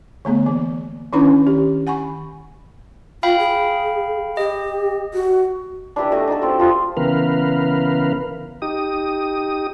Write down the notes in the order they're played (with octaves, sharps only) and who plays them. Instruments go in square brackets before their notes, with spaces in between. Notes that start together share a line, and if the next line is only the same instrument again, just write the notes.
[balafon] D3 A3 B3 G#4
E3 A#3
D#3 C#4 D4 E4 B4 A#5
D#3 G4
F#5 G#5 B5 C#6
[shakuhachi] F4 [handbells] F5 G5 B5
[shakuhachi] G#4
[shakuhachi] G4 [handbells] D#5
[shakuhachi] F#4
[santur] D4 E4 G4 B4
A3 F#4 D#5 F#5
D4 D#4 F#4 A4
C4 F4 G4
F3 F4 G4 D#6
[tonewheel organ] C#3 E3 B3 A#4 B4 F5
D#4 G4 D#6